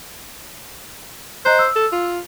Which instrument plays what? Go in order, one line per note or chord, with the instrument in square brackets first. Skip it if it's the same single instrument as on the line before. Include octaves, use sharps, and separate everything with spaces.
[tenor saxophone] C5 [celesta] D#5 A#5 F#6
[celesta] E6
[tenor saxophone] A4
F4